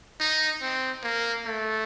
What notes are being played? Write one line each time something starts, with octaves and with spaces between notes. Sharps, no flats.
D#4
C4
A#3
A3